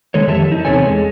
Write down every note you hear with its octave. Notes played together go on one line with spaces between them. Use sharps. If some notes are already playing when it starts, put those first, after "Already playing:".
D3 D#3 G#3 A4 C#5
F2 D#3 G4 E5 A5
D#4
E2 C3 B3 A4 C#5 G#5
G#3